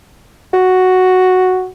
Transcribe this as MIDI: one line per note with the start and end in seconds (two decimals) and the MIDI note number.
0.53 1.68 66